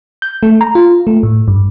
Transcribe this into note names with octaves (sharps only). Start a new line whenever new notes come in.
G6
A3
A#5
F4
A3
A2
G2